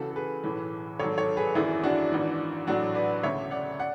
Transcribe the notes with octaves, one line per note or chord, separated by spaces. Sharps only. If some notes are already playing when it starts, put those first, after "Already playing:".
Already playing: C#2 C#3 E3 F#4 A4
A4
G#4 B4
B1 A2 E3
G#1 G#2 F#3 A4 C#5
A4 C#5
G#4 B4
G#1 F#2 E3 E4 G#4
D4 F#4
G#1 G#2 E3
A1 A2 F#3 D4 F#4
B4 D5
E1 D2 C#3 C#5 E5
D5 F#5
D5 F#5